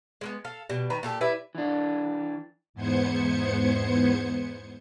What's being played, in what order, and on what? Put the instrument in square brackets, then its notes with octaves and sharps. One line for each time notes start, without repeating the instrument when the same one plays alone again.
[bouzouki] G#3 A#3 B3
A4 F5
B2 G3
D#3 B4 A#5
A#2 G4 A4
G3 E4 B4 D5
[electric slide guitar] E3 D4
[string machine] E2 G#2 B3 C5 G#6 C#7